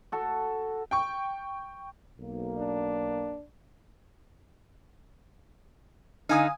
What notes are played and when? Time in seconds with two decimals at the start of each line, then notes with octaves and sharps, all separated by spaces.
0.12 F#4 A4
0.91 G5 C#6
2.19 B1 A#3
2.57 D4
6.29 D3 D#4 F5 G#5 D#6